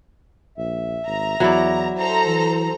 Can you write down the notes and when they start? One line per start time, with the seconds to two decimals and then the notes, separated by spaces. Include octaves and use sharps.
0.58 A#1 E5
1.06 G#1 A#5
1.40 E2 F#3 E4 D5
1.98 A4 C5 A#5
2.26 E3